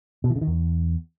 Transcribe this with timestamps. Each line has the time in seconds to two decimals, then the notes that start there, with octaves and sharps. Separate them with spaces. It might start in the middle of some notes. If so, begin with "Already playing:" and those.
0.24 B2
0.30 E3
0.36 C#3
0.41 D#3
0.47 E2